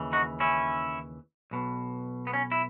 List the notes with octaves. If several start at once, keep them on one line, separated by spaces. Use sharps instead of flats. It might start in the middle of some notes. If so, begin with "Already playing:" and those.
Already playing: D#2 C#3 E3
D#4 F#4
C#4 E4
B1 B2
B3
C#4
E4